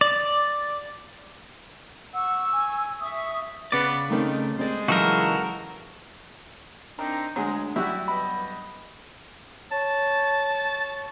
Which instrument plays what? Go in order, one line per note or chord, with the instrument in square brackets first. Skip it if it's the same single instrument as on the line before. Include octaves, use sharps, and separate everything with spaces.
[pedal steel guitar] D5
[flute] F#5 [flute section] C#6 E6
[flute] G#5
[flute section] E5 C#6 [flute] D#6
[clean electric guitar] C#3 D5 [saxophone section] B3 B4
[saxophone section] D#3 [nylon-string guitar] A3 C4 C#4
[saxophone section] G3 G#3 [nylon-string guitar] C4 C5 D5
[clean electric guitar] C#3 E3 D#4 [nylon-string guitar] F#3 E4 [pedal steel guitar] F#4 A4 A#4
[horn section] C4 D4 D#4 [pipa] A#4
[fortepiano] D2 G#4 [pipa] F#3 [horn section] G#3
[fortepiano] F#3 G3 [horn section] E4 [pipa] F#4 E5
[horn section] G2 B3 D#5 [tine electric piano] B5
[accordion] C#5 [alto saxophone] A5